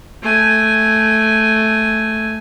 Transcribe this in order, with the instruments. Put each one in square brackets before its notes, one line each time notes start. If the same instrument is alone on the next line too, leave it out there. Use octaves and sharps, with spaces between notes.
[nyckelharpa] A3 G#5